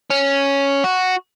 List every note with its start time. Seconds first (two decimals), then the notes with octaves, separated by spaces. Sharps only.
0.10 C#4
0.84 F#4